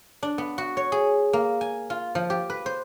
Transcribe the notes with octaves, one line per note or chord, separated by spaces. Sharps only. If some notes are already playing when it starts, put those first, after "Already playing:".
D4
B3
F#4
C#5
G#4
A#3
G#5
F4
F3
G4
B4
C5